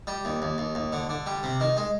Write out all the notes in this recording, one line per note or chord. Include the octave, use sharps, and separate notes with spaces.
G3
D#2
D#2
D#2
D#2
D3
D3
G3
C3
D#3
G#3